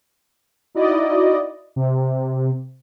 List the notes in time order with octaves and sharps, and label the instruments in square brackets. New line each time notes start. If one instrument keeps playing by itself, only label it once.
[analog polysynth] D#4 E4 F#4 D5 D#5
C3